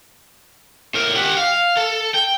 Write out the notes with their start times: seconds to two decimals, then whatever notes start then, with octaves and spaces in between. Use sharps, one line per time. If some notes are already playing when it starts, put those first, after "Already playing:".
0.95 A2 A#4
1.16 G4 F#5
1.37 F5
1.77 A4
2.14 G5